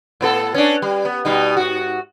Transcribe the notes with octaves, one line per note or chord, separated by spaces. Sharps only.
A2 B3 A4
C#4 D4
G3
B3
B2 G3 D#4
G#2 F#4